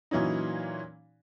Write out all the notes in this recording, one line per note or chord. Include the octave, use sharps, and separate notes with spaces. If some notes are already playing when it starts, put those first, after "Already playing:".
A#2 E3 F#3 C#4 D#4